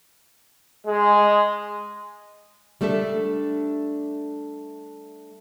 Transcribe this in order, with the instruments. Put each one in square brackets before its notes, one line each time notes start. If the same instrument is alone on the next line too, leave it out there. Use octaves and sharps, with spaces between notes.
[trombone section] G#3
[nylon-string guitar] G3 A3 D4 A4 E5